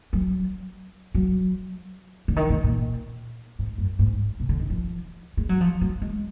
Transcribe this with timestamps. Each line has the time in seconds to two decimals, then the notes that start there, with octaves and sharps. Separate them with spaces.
0.13 F#3
1.15 F#3
2.28 D3
2.36 D#3
2.50 D3
2.64 A#2
3.59 G#2
3.78 F#2
3.99 G#2
4.40 B2
4.49 D3
4.60 D#3
4.70 F3
5.37 G#3
5.49 F#3
5.61 F3
5.81 F#3
6.02 G#3